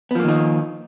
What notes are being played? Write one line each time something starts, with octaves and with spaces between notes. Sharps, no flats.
D#3 F3 A#3 B3 D#4